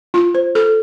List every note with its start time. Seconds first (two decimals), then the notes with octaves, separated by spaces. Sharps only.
0.14 F4
0.35 C5
0.55 A4